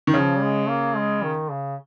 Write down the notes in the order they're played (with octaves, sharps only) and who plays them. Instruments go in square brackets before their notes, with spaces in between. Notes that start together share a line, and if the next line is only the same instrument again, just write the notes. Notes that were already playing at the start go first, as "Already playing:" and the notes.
[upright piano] D#3
[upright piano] C#3 [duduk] F3
[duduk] G3
G#3
A#3
G#3
D#3
C#3